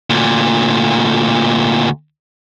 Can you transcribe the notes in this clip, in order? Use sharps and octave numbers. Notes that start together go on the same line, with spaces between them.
D2 A#2